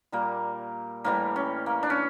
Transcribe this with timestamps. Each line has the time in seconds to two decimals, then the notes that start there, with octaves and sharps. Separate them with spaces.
0.12 A#2 G3 A#3
1.04 A2 E3 G3 A#3
1.36 C#4
1.66 A#3
1.83 D4
1.90 C#4